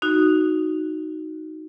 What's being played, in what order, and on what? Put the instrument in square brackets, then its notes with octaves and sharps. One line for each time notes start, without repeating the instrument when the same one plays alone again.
[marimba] D#4 F#4